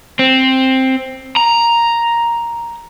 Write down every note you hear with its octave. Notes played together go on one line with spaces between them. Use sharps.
C4
A#5